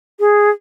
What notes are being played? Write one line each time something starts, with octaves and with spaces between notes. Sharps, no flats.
G#4